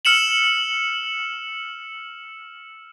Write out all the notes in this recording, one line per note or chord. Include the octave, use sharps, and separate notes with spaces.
E6 F6 C#7 E7 F#7